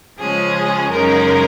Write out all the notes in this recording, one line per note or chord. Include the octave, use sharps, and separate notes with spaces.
C#3 F3 G#3 C#4 G#4
F#2 C#3 G#3 D#4 A#4